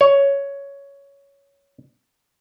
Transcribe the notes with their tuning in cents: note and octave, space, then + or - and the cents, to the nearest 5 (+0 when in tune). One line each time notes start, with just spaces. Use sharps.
C#5 +10